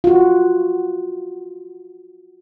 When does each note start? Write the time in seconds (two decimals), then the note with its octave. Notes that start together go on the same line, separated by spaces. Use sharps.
0.04 F4 F#4